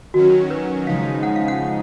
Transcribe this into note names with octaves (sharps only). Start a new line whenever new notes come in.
D#3 F#3 C#4 F#4
B4
C#3 F3 G#3 D#4 F5
F#5
F5
F#5